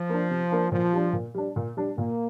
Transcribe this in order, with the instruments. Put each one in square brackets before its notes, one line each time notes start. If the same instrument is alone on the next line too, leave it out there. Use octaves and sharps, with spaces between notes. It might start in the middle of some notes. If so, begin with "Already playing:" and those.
Already playing: [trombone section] F3
[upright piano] A#3 D4
C3
A#3 D4
[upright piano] A#2 [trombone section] F3
[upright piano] G3 D4
A#2
G3 D4
A#2
G3 D4
[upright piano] A#2 [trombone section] A#3